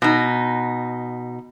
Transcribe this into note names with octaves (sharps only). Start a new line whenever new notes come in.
B2 D#4